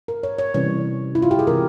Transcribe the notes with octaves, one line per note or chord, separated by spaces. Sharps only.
A#4
C#5
C#5
C3 E3 G3 C#4 C#5
E4
F4
G4
G#4
C3 E3 G#3 A#4